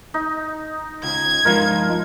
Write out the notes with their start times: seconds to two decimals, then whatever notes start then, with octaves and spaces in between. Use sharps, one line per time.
0.14 D#4
1.03 C#2 G#6
1.45 G2 F3 G#3 D#4 F4 A#4